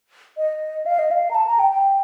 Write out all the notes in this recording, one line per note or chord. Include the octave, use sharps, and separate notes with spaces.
D#5
F5
D#5
F5
A#5
A5
A#5
G5
G5